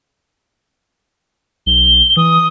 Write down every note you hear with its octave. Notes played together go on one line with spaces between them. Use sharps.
B1 G7
E3 D#6